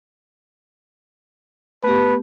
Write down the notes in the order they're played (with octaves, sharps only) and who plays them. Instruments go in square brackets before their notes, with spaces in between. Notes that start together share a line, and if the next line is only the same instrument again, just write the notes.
[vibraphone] A3 B3 G4 [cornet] B4